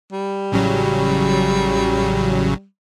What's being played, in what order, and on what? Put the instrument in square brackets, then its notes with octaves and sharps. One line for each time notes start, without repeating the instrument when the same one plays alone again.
[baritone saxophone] G3
[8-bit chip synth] A1 C#3 F#3